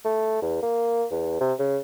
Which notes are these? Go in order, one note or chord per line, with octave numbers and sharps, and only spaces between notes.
A3
E2
A#3
E2
C3
C#3